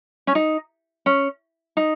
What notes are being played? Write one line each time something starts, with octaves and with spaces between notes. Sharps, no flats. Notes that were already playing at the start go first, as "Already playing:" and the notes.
C#4
D#4
C#4
D#4